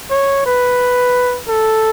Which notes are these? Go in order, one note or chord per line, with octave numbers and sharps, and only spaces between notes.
C#5
B4
A4